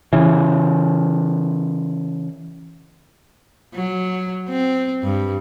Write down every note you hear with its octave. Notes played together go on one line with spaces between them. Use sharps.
C#3 E3
F#3
C4
G2